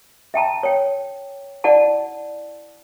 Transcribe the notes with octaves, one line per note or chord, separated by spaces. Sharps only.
E5 G5 A5 A#5
C#5 G5
E4 D5 F#5 A5